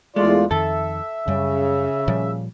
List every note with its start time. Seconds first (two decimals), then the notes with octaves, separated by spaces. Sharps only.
0.16 E2 G#3 A3 F4 D5
0.51 F2 D#3 A4 E5
1.28 F#2 C#3 G3
2.08 A#2 F3 G3